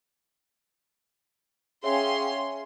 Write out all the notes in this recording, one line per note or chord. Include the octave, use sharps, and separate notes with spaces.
C#4 G#4 C#5 E5 F5 G5 G#5 C6